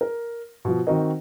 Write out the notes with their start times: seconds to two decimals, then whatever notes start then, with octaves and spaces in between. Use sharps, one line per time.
0.01 A#4
0.65 B2 F3
0.87 D#3 C4 D#4 F#4 A#4 D#5